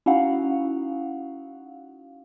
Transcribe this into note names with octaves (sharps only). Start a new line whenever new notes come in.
C#4 D#4 E4 F#4 F5 F#5